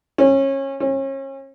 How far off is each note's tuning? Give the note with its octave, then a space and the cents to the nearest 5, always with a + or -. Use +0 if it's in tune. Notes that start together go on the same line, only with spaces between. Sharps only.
C#4 -25
C#4 -35